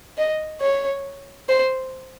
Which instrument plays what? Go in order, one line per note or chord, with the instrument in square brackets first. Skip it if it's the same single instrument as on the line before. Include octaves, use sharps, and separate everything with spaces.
[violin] D#5
C#5
C5